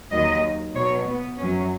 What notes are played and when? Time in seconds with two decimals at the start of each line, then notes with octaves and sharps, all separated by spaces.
0.11 D#2 D#3 F#3 D#5
0.74 B2 F#3 C#5
1.07 B3
1.38 F#2 F#3 C#4